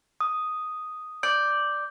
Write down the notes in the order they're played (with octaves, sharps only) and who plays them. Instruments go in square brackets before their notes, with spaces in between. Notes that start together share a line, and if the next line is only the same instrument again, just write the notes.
[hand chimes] D#6
[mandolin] D5 [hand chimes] G6